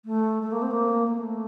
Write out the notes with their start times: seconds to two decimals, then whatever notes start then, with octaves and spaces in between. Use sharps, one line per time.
0.05 A3
0.43 A3
0.52 A#3
0.62 C4
0.71 A#3
1.07 A#3
1.18 A3